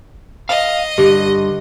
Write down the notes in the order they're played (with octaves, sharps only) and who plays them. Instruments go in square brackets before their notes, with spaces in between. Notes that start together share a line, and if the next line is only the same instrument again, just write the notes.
[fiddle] D#5 [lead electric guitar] F5
[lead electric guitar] G2 D3 [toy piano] G4